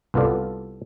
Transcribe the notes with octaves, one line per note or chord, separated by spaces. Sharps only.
C2 B3 F4 A4 D5